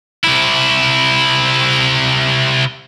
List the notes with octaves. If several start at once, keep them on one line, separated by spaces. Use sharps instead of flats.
C3 E4